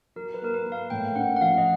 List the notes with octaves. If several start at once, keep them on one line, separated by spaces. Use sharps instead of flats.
F#3 A#4
B4
A#3 A#4
B4
A#3
F5
A2 G5
C#4 F#5
F#5
F3 F5
D#5